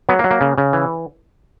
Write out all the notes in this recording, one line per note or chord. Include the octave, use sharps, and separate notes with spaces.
F#3 B3
A#3
F#3
A#3
C#3
C#3
E3